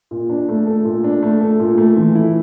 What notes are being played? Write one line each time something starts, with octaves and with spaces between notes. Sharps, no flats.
A#2
D4
A3
A4
A#2
D4
A3
A4
A#2
A3
E3
E4